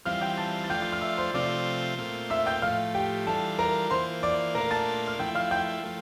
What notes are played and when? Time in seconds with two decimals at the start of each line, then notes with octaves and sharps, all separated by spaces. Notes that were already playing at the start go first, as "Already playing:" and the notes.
0.05 E3 G3 C4 F4 F5 F6
0.21 G5 G6
0.37 A5 A6
0.64 A6
0.70 F3 A3 D4 F4 G5 G6
0.82 G6
0.92 F6
1.01 E5 E6
1.18 C5 C6
1.34 C3 F3 A3 C4 F4 D5 D6
1.98 A#2 A3 C4 F4
2.30 E5 E6
2.46 G5 G6
2.62 A2 F3 A3 F5 F6
2.94 G4 G5
3.26 E3 G3 D4 F4 A4 A5
3.59 A#4 A#5
3.90 E3 A#3 F4 C5 C6
4.23 D5 D6
4.55 A#2 A3 D4 F4 A#4 A#5
4.71 A5 A6
5.08 F6
5.19 F3 A3 E4 G5 G6
5.35 F5 F6
5.51 G5 G6
5.83 F3 A3